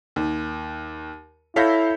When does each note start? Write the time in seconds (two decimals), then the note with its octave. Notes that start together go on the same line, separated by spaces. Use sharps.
0.16 D#2
1.56 E4 A4 C#5 F5 G6 A#6 B6